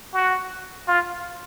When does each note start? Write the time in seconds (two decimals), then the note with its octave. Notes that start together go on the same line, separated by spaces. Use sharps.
0.13 F#4
0.88 F4